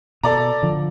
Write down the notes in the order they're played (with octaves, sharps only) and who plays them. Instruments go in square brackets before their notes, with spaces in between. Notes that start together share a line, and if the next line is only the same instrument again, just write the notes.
[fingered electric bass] B2 [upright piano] A4 D5 A#5
[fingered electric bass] D3 F3